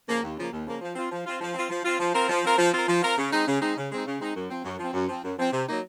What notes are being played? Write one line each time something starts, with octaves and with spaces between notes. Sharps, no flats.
C#3 F3 A#3
D#2
C#3 F3 A#3
D#2
C#3 F3 A#3
F3
C4 F4
F3
C4 F4
F3
C4 F4
F3
C4 F4
F3
C4 F4 A#4
F3
C4 F4 A#4
F3
C4 F4 A#4
F3
C4 F4 A#4
C#3
G#3 C4 D#4
C#3
G#3 C4 D#4
C#3
G#3 C4 D#4
C#3
G#3 C4 D#4
F#2
F3 C4
F#2
F3 C4
F#2
F3 C4
F#2
F3 C4
C3
F#3 A#3 D#4